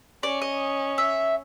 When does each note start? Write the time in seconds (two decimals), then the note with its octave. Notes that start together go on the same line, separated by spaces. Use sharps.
0.23 C#4 D5
0.42 D#5
0.98 E5